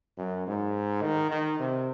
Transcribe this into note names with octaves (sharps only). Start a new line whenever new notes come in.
F#2
G#2
D#3
D#3
C3